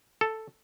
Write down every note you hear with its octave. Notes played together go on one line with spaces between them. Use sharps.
A4